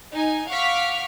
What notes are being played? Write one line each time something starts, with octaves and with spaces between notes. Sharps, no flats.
D#4 G#5
F5 F#5 C#6 D6 F6 B6